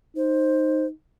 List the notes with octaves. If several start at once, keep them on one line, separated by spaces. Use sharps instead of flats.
D#4 C5